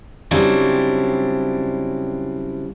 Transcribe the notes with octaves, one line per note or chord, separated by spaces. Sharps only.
C#3 F#3 G3 C4 D4 E4